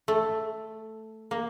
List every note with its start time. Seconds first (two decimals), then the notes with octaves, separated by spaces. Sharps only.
0.08 A3
1.31 A#3